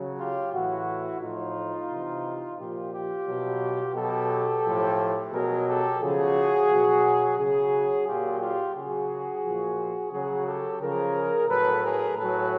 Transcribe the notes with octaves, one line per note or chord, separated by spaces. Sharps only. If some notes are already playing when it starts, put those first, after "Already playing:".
Already playing: C#3 F#3
F4 G4
A2 E3 E4 F#4
A2 F3 D#4 F4
C3 E3
A#2 F3 F4 G4
F4 G4
B2 F#3
B2 F#3 G4 A4
A2 F3
B2 F#3 G#4 A#4
G4 A4
C#3 F3 F#4 G#4
B2 F#3
C#3 F#3 F#4 G#4
A#2 F#3 F4 G4
F4 G4
C#3 F#3 F#4 G#4
A#2 F3
C#3 F#3 F#4 G#4
G4 A4
C#3 F3 G#4 A#4
A2 F#3 A4 B4
G#4 A#4
A2 F#3 A4 B4